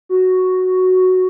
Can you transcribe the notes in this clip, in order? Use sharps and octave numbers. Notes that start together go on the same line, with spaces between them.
F#4